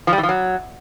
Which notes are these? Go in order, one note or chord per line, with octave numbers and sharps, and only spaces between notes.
F3
G3
E3
F3
F#3